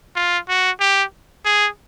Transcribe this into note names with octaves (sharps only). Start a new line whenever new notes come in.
F4
F#4
G4
G#4